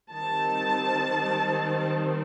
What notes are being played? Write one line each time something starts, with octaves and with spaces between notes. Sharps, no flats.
D#3 G3 C4 A5